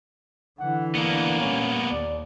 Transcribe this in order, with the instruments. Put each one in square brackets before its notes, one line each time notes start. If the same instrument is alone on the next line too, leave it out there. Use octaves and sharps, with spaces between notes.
[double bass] D3 E3 [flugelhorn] F#5
[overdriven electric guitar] A#3 B3 [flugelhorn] D4
[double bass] A#2 G3 [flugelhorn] C#4
[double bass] D#2 [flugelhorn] D5